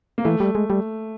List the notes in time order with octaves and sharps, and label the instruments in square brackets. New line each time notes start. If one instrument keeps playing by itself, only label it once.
[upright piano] A#3
[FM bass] E3 [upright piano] A3
[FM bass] G3
G#3
G3